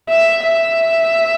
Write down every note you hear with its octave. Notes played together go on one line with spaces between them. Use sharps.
E5
E5